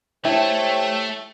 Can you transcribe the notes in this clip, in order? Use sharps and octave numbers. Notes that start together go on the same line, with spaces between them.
A3 E4 G4 A4 C5 C#5 G5